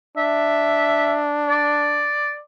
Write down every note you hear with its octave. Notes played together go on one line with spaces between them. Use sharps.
D4 E5
D5